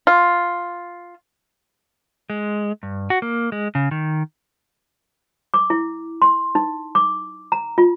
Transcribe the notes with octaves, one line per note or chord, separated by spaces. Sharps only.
F4
G#3
G2
F#4
A#3
G#3
C#3
D#3
D6
E4
C6
D#4
D6
A#5
F4